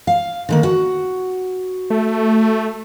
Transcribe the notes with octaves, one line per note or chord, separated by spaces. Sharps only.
F5
D3 D#3 A#3
F#4
A3